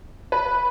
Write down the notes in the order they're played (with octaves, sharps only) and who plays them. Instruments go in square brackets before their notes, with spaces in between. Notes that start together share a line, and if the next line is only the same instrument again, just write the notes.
[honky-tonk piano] B4